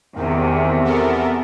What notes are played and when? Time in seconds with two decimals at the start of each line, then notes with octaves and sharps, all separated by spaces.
0.15 E2 C3 D#3
0.84 B3 A4 A#4